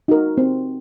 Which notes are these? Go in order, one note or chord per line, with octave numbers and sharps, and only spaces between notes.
D#4 F#4 A#4
C4